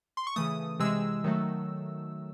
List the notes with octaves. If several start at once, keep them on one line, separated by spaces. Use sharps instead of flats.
C6
C#6
C#3 E3 A3 D#6
C3 E3 G#3 E6
D#3 F#3 A3